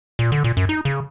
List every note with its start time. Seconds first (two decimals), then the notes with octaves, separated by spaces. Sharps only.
0.19 A#2
0.32 D3
0.44 A#2
0.57 F#2
0.69 D#4
0.85 C#3